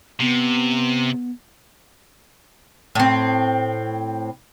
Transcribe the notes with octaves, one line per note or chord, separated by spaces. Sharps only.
C3 B3
A2 C4